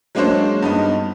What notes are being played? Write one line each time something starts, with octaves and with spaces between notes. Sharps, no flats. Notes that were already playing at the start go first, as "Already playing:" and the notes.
F#3 G#3 A#3 D4 C5 C#5
G2 B3 D#4